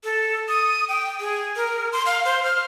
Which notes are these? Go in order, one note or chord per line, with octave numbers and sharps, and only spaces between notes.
A4
D#6
G5
G#4
A#4
C6
F5
C5
F6